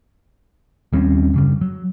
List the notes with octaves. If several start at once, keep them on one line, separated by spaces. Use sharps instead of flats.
D#2 G3 C4 C#4
F#2 C#3 G3
F#3